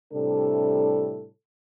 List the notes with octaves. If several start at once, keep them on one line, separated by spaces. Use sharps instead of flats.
A2 C3 G3 D4 A4